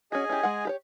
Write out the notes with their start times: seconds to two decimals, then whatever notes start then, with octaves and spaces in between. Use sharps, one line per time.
0.12 C#4 F#4 G#4 D#5 G#5
0.29 C#4 E4 G4
0.43 G#3 F#5
0.65 G4 B4 C#5